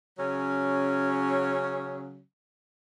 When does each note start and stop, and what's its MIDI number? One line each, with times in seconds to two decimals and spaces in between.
0.19 2.22 49
0.19 2.22 54
0.19 2.22 61